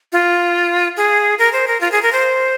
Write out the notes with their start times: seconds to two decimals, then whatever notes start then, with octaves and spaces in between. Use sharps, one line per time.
0.13 F4
0.97 G#4
1.39 A#4
1.53 C5
1.67 A#4
1.81 F4
1.92 G#4
2.02 A#4
2.12 C5